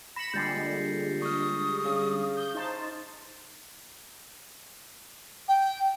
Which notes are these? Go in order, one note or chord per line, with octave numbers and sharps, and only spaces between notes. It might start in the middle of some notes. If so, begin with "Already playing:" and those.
B5 A#6 C#7 E7
A#1 D3 G3 G#3 G6 A6 C7
C#6 D#6 F6
C#3
G6
D#4 C5 A5
G5